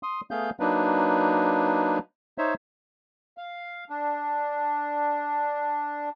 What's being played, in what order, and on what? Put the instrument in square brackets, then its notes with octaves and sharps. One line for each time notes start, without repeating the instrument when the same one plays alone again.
[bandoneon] C6 D#6
A3 B3 G#4 F5 G6
F#3 A#3 D4 D#4 B4
D#4 C5 C#5 E5
[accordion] F5
D4